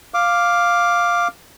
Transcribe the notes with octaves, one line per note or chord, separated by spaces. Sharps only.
F5 D6